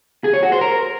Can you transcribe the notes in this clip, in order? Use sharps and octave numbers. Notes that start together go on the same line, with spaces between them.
G#4
C#5
F#4
C5
A#4